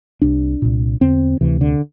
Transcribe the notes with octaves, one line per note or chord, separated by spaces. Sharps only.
C2 C3 D4
C2 A#2
E2 D3 C4
D2 C3 E3
D3